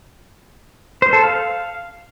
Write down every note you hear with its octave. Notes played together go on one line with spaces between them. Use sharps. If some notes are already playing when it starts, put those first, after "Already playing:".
C5
A4
F5